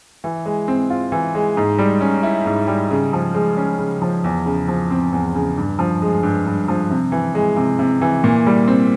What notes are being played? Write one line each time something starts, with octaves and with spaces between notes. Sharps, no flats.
E3
G#3
C4
F4
E3
G#3
G#2
G3
C#4
E4
G#2
G3
C#3
F3
G#3
C#4
C#3
F3
E2
C#3
F3
C4
E2
C#3
G2
F3
G#3
G2
G2
F3
C3
E3
G#3
C3
C3
E3
A#2
G3
C4